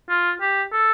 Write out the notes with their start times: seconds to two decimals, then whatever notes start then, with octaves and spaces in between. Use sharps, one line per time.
0.10 F4
0.41 G4
0.73 A4